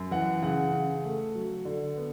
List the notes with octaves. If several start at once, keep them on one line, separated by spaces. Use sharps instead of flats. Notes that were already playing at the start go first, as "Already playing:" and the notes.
Already playing: F#2
E3 F#5
C#3 F#5
C#3
A3
F#3
D3
B3